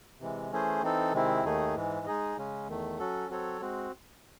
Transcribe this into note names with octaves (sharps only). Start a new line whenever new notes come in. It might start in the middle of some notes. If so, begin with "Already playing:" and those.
C3 E3 G#3
E3 A3 C#4 G#4 C5
E3 C4 D#4 A4
C3 D#3 G#3 C4 E4
D#2 D#3 A3 D#4 G#4
G#2 E3 G#3
G#3 D#4 G#4 D#5
C#3 G#3 C#4
E2 D#3 A3
F#3 C#4 F#4 A4
F#3 C4 F#4 A4 C#5
G#3 C4 F#4